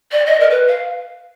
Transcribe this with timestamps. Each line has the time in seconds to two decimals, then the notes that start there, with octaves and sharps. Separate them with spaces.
0.11 D5
0.25 D#5
0.40 A#4
0.50 B4
0.68 F5